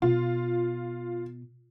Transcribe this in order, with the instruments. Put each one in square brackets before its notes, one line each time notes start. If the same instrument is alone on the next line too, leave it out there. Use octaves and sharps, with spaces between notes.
[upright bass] B2 [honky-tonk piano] F4